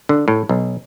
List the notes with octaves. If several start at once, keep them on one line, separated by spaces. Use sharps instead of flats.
D3
A2
B1